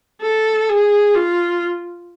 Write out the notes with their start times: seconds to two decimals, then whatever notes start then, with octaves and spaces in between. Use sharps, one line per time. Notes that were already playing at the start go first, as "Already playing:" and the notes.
0.22 A4
0.69 G#4
1.14 F4